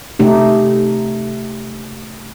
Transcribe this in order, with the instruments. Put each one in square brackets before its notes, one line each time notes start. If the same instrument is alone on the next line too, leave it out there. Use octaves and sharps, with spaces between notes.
[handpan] C3 A3 D#4 G4